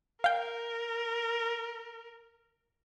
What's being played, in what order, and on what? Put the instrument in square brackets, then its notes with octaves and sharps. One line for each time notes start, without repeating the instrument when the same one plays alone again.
[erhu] A#4 [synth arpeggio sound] F5 G5